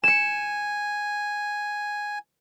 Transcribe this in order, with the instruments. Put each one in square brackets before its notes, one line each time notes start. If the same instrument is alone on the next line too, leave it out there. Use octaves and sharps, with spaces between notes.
[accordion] G#5 [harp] C#7 E7